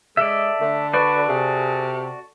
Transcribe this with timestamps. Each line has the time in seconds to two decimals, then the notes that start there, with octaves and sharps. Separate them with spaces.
0.17 G#3 A4 D5 E5
0.61 D3 A3
0.93 F#4 B4 D5 C#6
1.29 C3 G#4